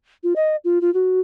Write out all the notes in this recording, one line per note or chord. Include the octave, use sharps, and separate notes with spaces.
F4
D#5
F4
F4
F#4